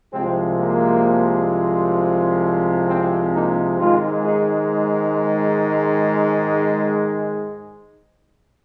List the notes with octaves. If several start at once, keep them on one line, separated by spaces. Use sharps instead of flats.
C2 C3 F3 G#3 C4
A#3
C4
A#3 D#4
G#2 D#3 G#3 C4 F4
D#4 G#4